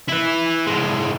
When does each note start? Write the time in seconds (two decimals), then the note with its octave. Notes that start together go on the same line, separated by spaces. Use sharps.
0.08 E4 B4
0.67 A2 G#3